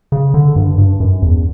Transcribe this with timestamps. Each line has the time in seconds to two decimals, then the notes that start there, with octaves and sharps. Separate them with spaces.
0.12 C#3
0.34 D3
0.56 G2
0.78 G2
1.00 F#2
1.22 E2